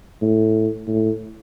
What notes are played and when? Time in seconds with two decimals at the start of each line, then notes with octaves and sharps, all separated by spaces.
0.22 A2
0.87 A2